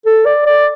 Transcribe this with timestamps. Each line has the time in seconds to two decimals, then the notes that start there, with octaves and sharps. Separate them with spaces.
0.06 A4
0.26 D5
0.46 D5